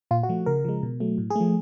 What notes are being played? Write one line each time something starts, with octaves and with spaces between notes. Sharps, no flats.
A#2 F4
F#4
F3 A3
C#3 A#4
F3 G#3
B2
F#3 A3
A2
G#4
F3 A3